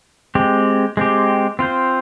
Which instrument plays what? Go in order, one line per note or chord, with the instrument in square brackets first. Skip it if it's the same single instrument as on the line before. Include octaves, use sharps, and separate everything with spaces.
[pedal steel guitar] G#3 C4 G4
G#3 C4 G4
C4 F4 C5